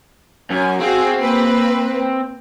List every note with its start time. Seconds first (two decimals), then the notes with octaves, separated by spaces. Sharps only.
0.50 F#2 C#4 G#5
0.80 C4 F#4 G#4 F5
1.20 A#3 B4